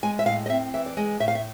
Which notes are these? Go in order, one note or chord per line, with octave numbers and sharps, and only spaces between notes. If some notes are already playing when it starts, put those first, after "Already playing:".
G#3 G#5
E5
A2 F5
D#5
C4 E5
E3 E5
D5
G#3 D#5
A2 E5
F5
E5